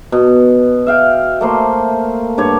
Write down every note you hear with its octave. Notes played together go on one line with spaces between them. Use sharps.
B2
E5 F5 G5
A3 A#3 C5 C6
G2 G4 C#5